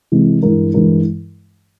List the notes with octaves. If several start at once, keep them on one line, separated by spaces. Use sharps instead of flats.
C3 E3 G#3
G2 E3 G#3 E4 A#4
G2 E3 G#3 E4 A#4